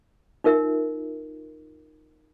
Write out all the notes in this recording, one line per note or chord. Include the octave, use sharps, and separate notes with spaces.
D#4 F4 A#4 E5